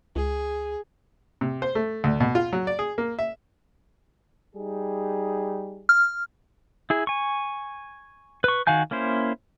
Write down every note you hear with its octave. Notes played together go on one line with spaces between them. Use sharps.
C#2 G#4
C3
C5
A3
D2
B2
F4
F#3
D5
G#4
A#3
E5
G3 D#4 G#4
F6
E4 G#4
G#5 C#6
B4 C#6
D#3 F#4 F5 G#5 G6
A#3 C#4 E4 C5